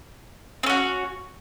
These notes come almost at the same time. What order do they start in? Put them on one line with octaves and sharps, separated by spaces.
C4 C#4 F#4